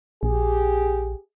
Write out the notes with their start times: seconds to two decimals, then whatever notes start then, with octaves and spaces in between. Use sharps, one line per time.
0.23 A#1 G4 G#4